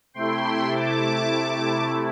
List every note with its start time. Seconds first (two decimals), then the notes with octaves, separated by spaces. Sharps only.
0.14 C3 A3 E4 G5 C6
0.75 A5 D6